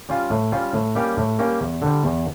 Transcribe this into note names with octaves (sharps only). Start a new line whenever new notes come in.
G3 C#4 F4
A2
G3 C#4 F4
A2
G3 A#3 C#4 G4
A2
G3 A#3 C#4 G4
E2
D3 G3
E2